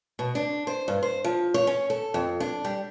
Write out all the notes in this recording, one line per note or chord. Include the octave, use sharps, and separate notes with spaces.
B2
D4
C5
G2
C5
F3
C#5
C#4
A4
F2
D4
G3